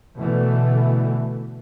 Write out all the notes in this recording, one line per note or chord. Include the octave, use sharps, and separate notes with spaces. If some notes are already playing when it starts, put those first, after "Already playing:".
B2 D3 E3 A3